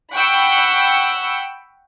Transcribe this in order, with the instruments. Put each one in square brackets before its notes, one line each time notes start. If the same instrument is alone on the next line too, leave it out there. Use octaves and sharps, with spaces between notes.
[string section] F#5 G5 B5 C#6 E6